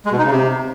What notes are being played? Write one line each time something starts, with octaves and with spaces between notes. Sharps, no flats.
G#3
B2
D#4
C#3
C3